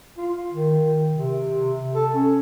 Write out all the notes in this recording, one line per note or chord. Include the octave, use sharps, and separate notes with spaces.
F4
D#3
C3
A4
C#4